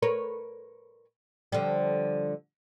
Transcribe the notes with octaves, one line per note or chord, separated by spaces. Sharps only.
A#4 B4 C#5
D3 F3 G3